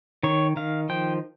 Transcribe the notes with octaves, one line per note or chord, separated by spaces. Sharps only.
D#3 C#5
D#3 F5
F3 G5